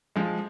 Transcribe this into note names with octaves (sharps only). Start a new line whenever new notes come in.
F3 G#3